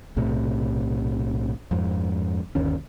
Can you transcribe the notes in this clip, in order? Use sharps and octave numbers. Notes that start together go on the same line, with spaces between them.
B1 A2 C3
F2 G#2
G1 D#2 C#4